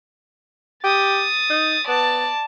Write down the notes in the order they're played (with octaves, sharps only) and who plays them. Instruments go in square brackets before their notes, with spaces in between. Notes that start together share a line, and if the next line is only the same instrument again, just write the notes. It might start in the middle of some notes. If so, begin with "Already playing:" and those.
[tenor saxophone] G4 [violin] D#6 A6
[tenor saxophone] D#4
[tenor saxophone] B3 [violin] D5 A5